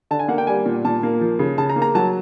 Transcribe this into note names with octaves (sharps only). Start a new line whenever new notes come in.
D3 A5
G#5
A#3 F#5
G5
G3 G#5
A#2
A#2 A5
A#3
F3
C#3
C#3 A5
A#5
A#3
A#5
F#3 A5